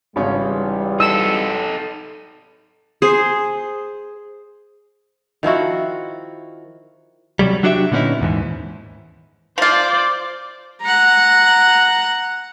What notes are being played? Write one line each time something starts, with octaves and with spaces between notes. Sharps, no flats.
G#1 G#2 C#3 E3 G3 C#4
D#4 A4 E6
G#4 C5
D#3 F3 E4 F#4
C3 F#3 G3
F#3 D4 F#4 G4 D#5 E5
A#2 D3 B3 C#4 D#4 E4
D#2 G#2 E3
F3 F4 C5 D5
F#5 A#5